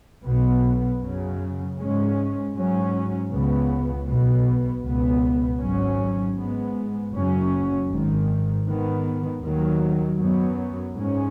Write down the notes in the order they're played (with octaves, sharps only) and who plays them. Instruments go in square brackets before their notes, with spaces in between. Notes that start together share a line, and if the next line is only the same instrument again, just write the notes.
[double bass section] B1 B2 B3
F#2 C#3 F#3
G#2 G#3 C#4
G#2 F#3 C#4
C#2 C#3 B3
B1 B2 B3
C#2 B2 B3
G#1 G#2 F#3 C#4
G#2 G#3 B3
F#1 F#2 F#3 C#4
G#1 G#2 D#3
G#2 D#3 B3
D#2 D#3 F#3
F#2 F#3 B3
G#2 G#3 C#4